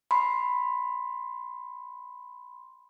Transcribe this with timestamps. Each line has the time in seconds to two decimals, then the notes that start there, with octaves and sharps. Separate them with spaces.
0.11 B5 C6